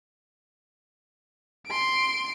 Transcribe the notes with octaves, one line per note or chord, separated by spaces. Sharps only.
C6 D7